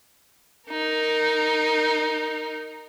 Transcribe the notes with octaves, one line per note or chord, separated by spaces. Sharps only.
D#4 A#4